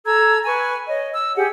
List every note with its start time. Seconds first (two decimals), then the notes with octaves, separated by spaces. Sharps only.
0.05 A4 A#5 E6 G#6
0.46 B4 G#5 C#6
0.88 C#5 D#5
1.13 E6
1.36 G4 G#4 F#5